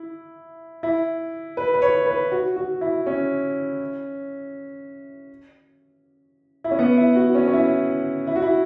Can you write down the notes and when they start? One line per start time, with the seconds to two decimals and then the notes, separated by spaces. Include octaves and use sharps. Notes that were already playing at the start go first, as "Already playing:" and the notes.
Already playing: E4
0.83 E4
1.57 B4
1.74 B4
1.82 C#5
2.06 B4
2.32 F#4
2.56 F#4
2.81 E4
3.06 C#4
6.64 E4
6.71 C#4
6.79 B3
6.97 E4
7.15 F#4
7.35 C#4
7.48 C#4
7.53 E4
8.27 E4
8.36 F#4
8.42 E4